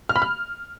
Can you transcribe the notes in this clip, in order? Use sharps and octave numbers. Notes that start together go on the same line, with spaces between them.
F6
B5
F6